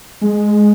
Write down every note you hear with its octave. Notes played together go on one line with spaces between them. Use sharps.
G#3